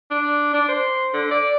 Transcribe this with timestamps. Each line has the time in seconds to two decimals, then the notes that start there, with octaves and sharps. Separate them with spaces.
0.11 D4
0.53 D4
0.69 C5
1.14 D3
1.31 D5